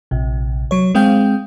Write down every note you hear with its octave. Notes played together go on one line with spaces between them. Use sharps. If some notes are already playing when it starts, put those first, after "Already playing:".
A#1 C3
F#3 C#5
G#3 C4 G#4 F5 G5 G6